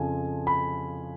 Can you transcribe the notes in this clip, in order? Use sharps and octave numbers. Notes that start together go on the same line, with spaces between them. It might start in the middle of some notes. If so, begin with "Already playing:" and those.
Already playing: F2 C#3 F3 G#5
B5